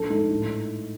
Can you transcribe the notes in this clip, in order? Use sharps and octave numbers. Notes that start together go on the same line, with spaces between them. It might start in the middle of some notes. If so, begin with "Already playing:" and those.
Already playing: A#1 A4
G#2
A2